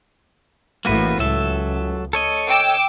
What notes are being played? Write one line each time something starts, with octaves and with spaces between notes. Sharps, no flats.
A1 A2 A#3 F#4 B4
C#2 F#3 A4 E5
A4 C#5 D#5
G5 D6 E6